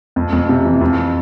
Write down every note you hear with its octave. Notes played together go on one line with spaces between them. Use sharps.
F2
F2
C3
E3
F2